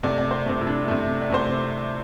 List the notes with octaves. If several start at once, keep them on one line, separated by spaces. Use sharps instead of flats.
C3 A3 D5
D5
C5
C3 A3
E4
D4
C3 A3
D5
C3 A3 C5